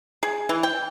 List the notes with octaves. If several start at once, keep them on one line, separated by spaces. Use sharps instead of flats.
G#4
E3
G5